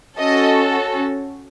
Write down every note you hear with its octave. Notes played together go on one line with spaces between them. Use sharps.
C#4 F#4 A4 D#5